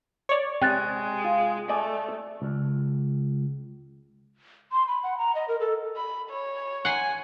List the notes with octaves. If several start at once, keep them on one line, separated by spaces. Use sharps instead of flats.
C#5 D5
C3 G#3 G5 F#6 A6
F4
A3 D5 D#5 G#5
C#2
C6
B5
F#5
A#5
D#5
A#4
A4
B5
C#5
F#5 G#5 C6